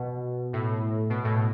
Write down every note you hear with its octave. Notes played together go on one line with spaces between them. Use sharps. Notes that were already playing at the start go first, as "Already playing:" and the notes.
Already playing: B2
A2
B2
A2